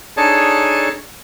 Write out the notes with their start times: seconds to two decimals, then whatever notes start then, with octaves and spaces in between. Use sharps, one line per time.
0.17 D4 D#4 G#4 A4 C#5 A5